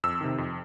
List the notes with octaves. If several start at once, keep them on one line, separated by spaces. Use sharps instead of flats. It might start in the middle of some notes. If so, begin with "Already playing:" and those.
F2 E6
C3 D#3
F2